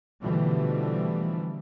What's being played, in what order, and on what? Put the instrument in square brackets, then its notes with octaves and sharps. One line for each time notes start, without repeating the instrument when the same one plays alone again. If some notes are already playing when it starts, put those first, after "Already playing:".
[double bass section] B2 D3 E3 F3 G3 A3